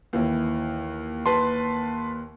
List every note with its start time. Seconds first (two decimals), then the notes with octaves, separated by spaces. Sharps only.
0.13 D#2 E3
1.26 B4 A5 C6